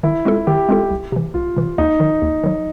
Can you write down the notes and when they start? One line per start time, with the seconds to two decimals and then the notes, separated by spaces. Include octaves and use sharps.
0.03 D#3 E4
0.25 G#3 C4 F4 A4
0.47 D#3 G4
0.69 G#3 C4 F4 A4
0.91 C2
1.12 C3 E3
1.34 C2 F4
1.57 C3 E3
1.78 D#2 D#4
2.00 D#3 F#3
2.22 D#2
2.44 D#3 F#3